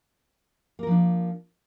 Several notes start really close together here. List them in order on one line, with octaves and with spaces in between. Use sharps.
A#3 A#4 F3 D4